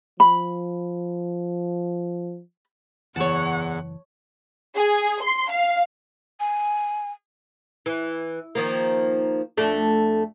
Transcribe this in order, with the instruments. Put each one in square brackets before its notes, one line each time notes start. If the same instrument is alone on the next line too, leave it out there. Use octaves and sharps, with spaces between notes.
[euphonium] F3 [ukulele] B5
[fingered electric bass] F#1 E3 [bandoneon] E2 [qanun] C#5 A5 [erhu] F#5
[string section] G#4
C6
F5
[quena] G#5
[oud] E3
D#3 F3 A#3
F2 A3 D4